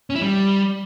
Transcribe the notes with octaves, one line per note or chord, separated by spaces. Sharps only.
C#4
E4
G3